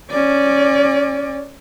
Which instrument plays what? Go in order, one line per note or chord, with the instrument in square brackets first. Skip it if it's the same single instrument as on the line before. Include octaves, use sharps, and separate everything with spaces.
[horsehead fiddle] C#4 D5